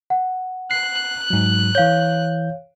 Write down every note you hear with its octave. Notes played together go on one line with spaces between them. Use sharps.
F#5
F#6 C7
G#2 F#3
E3 C#5 F5 G6